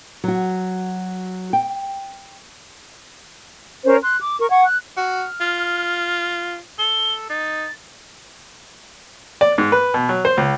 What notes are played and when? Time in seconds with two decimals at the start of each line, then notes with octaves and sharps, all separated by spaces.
0.24 F#3 F#4
1.53 G5
3.85 C#4 A#4 C5 C#5
4.03 C6 F#6
4.20 D6
4.39 A#4 C#6
4.50 F#5 C#6 G#6
4.66 F#6
4.97 F#4 F6
5.41 F4
6.79 A4 G7
7.30 D#4 A6
9.41 D5
9.58 G#2
9.72 B4
9.94 B2
10.09 F#3
10.25 C5
10.37 C#2